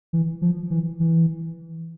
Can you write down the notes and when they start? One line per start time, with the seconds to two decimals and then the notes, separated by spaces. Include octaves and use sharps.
0.13 E3
0.42 F3
0.70 E3
1.00 E3